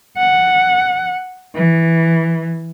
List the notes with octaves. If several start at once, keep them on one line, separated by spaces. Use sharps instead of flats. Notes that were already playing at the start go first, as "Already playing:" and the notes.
F#5
E3